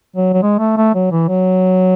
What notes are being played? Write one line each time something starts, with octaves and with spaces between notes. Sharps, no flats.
F#3
F#3
G#3
A3
A3
F#3
E3
F#3